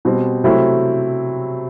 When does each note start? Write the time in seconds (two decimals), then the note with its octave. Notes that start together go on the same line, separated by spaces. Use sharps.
0.05 B2 G3 C4
0.44 C3 F#3 A3 C4 E4